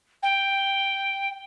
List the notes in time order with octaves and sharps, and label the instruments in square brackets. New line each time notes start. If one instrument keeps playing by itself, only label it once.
[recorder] G5